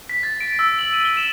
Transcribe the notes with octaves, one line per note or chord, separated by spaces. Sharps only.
B6
A6
D7
E6
F#7
D#7
G7
E7